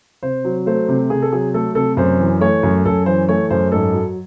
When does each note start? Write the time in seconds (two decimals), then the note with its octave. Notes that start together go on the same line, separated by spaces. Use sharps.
0.23 C3 C5
0.45 F#3
0.66 A3 C5
0.88 C3
1.10 C3 G#4
1.22 A4
1.33 F#3 G#4
1.54 A3 A4
1.75 C3 A4
1.97 F#2 C5
2.19 E3
2.41 A3 C#5
2.63 F#2
2.85 F#2 A4
3.06 E3 C5
3.28 A3 C#5
3.50 F#2 C5
3.72 G#2 A4
3.93 F#3